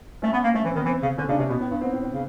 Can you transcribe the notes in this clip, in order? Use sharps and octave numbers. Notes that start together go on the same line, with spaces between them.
A3 C#4
B3
A#3
A3 C#4
E3 C4
D#3 B3
E3 C4
C#3
D3 C#4
C#3 D4
C3 C#4
B2 B3
A2
G2
G#2 C4
A2
A2
C#3